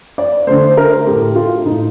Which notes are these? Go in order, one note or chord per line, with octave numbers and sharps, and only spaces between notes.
D5
D3 A3 C5
A#4
A2 A3 G4
F4
A2 A3 D#4